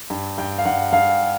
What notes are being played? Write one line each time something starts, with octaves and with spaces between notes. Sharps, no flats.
G2
G2 G5
F5
G2 F#5
G2 F5